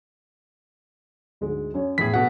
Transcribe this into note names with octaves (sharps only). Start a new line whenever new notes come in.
D2 G#2 G#3
F#2 C#5
E2 A2 G#4 B6
B2 A3 F#4 F#5